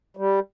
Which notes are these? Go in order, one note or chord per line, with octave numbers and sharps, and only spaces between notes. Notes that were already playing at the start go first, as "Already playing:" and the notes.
G3